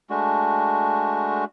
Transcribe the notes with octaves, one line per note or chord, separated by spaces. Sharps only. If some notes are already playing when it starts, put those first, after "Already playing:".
G#3 A3 D4 F#4